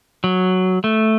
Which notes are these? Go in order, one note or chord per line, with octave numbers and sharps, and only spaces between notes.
F#3
A3